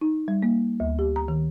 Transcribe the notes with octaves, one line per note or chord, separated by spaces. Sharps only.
D#4
G3
A#3
D2
G4
A#5
D#3